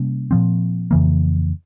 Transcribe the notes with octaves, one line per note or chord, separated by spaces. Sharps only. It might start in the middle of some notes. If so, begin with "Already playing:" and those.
Already playing: C3 G3 A#3 C#4
A#2 F3 C4
F2 C#3 E3 A#3